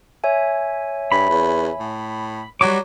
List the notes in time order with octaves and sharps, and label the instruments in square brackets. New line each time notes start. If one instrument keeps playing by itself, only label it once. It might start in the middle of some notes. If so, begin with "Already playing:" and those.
[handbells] C#5 E5 G#5
[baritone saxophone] G2 [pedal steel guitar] B5
[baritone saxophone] E2
A2
[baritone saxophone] F#3 [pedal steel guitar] G3 F#4 D6